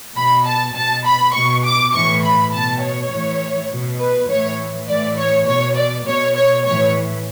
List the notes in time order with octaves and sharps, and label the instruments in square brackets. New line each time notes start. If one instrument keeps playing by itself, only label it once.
[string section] B2 B5
A5
B2 A5
B5
B2 C#6
D6
A2 E3 C#6
B5
B2 A5
C#5
A2 E3
B2
B4
A2 E3 C#5
A2 E3 D5
C#5
B2 C#5
D5
B2 C#5
C#5
A2 E3 C#5